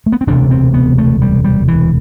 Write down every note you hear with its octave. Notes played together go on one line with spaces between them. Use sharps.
A3
B3
C4
E1 D2 C3 D4
C4
B3
A3
G3
G3
E3